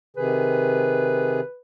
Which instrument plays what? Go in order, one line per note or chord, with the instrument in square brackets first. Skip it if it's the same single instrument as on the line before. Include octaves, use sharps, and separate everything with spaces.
[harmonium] C3 D#3 G#4 [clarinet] B4